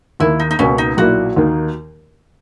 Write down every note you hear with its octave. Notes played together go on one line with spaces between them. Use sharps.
D#2 D#3 A#3 E4
D#4
D#4
C#2 B2 A#3 C#4
D#4
B1 A#2 A#3 E4 F#4
D#2 D#3 A#3 D#4